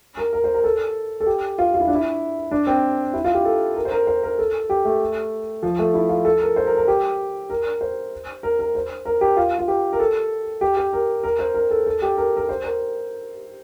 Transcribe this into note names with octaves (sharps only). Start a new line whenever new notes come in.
A#4
A#4
C5
A#4
A4
A4
G4
F4
F4
E4
D4
E4
D4
C4
E4
F4
G4
A4
A#4
C5
A#4
C5
A#4
A4
G4
A3
F3
A3
E4
F4
A4
A#4
C5
A#4
A#4
G4
A#4
C5
A#4
A#4
C5
A#4
G4
F4
F4
G4
A#4
A4
G4
G4
A#4
A#4
C5
A#4
A4
A4
G4
A#4
A#4
C5
A#4